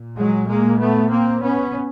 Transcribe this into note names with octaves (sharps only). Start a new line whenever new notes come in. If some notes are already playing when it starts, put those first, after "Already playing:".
Already playing: A#2
F#3 G#3
G#3 A#3
A3 B3
A#3 C4
B3 C#4